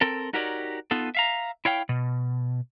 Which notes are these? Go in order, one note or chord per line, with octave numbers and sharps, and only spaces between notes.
C4 A4 A#4
D#4 F#4 G4 A#4 C#5 D5
B3 D#4 F4 A4
E5 F5 A#5
E4 C#5 F5 G5
B2